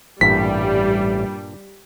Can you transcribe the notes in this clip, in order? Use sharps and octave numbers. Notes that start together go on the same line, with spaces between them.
A1 G2 A#2 G3 B6